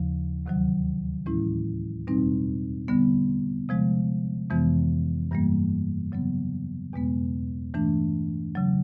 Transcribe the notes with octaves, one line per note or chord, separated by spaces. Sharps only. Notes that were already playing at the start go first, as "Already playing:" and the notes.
Already playing: D#2 C#3 F3
D2 C3 D#3 F#3
A2 E3 G#3 C#4 E4
E2 B2 G3 C4 D#4
D3 G3 B3
C3 F3 G#3
F2 C3 E3 G#3 B3
G2 E3 G3 A#3
C#3 F#3 B3
E2 B2 G#3 B3
G2 E3 A3 D4
C#3 F#3